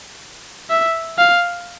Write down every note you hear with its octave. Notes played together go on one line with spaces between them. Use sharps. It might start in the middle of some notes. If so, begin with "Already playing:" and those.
E5
F5